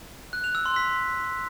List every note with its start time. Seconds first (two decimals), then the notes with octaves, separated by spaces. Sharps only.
0.33 F#6
0.44 F7
0.55 E6
0.65 C6
0.76 B6